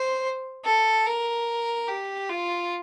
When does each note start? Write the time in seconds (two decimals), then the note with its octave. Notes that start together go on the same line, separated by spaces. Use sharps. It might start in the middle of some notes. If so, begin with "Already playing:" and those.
Already playing: C5
0.65 A4
1.06 A#4
1.88 G4
2.30 F4